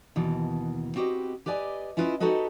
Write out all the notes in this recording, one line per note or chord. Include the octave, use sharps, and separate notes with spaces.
D#2 B2 E3
C4 F#4 G4 B4 D#5
G4 B4 D5 D#5 G#5
C#4 E4 F4 B4 C#5 D#5
D#4 F#4 G4 A4 B4 D#5